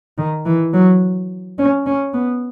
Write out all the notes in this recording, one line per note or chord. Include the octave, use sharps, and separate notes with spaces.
D#3
E3
F#3
C#4
C#4
B3